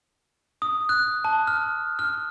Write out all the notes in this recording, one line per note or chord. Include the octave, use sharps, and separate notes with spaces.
D#6
F#6
A5
F6
F6